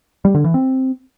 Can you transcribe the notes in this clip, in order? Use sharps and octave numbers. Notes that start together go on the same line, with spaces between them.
G3
D3
E3
C4